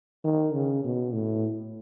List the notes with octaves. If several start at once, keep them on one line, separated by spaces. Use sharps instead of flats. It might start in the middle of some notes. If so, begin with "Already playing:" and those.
D#3
C#3
B2
A2